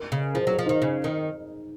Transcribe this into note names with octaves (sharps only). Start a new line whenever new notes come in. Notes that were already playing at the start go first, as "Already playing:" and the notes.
Already playing: A#4
C#3
F3 G#4
F#3 G#4
F3
D#3 D#4
C#3
D#3